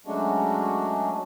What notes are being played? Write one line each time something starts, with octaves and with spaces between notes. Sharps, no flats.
F#3 G#3 A3 C#4 D4 F#4